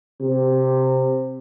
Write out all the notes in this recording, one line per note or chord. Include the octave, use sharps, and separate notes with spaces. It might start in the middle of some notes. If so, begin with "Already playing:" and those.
C3